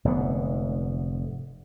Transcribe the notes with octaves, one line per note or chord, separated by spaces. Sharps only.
F1 G#2 D3 B3